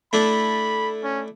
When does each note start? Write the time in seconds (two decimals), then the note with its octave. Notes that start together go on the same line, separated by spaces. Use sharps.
0.13 A3 D4 E4 B5
1.04 C#4